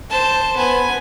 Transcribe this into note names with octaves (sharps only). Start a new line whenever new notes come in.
C5 A5
B3 G#5